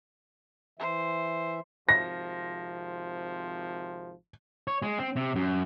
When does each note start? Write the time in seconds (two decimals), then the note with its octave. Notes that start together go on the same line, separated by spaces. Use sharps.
0.79 E3 C5 E5
1.89 G#1 C3 F3 A#6
4.67 C#5
4.82 G#3
4.99 C4
5.16 C3
5.36 F#2